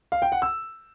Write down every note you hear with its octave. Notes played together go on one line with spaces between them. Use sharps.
F5
G5
F#5
E6